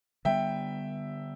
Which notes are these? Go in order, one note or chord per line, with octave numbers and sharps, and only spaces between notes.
D3 G3 B3 E5 G5